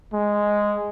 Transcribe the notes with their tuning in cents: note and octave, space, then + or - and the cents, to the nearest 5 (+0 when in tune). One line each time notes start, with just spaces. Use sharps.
G#3 -5